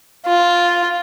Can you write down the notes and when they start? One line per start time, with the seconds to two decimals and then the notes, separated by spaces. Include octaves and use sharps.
0.27 F4